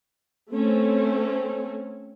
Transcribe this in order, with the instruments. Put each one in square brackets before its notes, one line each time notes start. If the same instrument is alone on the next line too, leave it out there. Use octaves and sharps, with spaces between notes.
[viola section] A3 C4 C#4